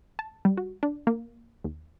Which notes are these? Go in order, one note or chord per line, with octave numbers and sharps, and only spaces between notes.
A5
G3
F#4
D4
A#3
D#2